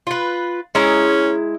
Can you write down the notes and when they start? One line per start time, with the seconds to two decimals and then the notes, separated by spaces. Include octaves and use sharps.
0.07 F4 B4
0.75 G#3 C#4 E4 A#5